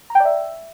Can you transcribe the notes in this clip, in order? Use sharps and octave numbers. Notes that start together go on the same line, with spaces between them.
A#5
G5
D5
E5